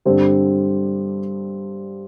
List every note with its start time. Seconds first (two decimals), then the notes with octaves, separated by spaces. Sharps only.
0.05 G2 D3 G3 C4